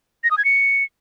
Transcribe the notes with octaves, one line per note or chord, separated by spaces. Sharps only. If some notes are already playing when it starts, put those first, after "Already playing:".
A#6
D#6
G#6
C#7